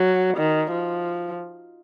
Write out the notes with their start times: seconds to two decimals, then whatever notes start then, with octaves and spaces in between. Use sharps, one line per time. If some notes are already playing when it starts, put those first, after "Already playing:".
Already playing: F#3
0.37 D#3
0.71 F3